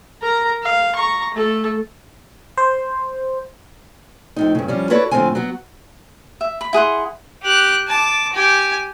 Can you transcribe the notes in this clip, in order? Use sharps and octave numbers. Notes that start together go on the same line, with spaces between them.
A#4 A#5
F5
A#5 C#6
A3 A4
C5
F2 A2 D#4
G2 C#3
F3 G3 C#4
E4 F#4 A4 B4 C#5 D5
F2 A2 D3 C4 F4 G#5
F#3 B3 F#4
E5
B5
E4 G#4 F#5 C6
G4 F#6
A5 D6
G4 G#5